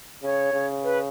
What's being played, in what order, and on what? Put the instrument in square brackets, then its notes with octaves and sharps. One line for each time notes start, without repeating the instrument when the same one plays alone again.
[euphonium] C#3 [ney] C#5
[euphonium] C#3
[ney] B4